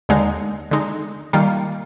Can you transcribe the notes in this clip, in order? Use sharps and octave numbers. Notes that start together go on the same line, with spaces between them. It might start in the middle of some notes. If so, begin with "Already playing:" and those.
D#2 D3 G#3 D#4
D3 G#3 D#4
D#3 G3 A#3 F4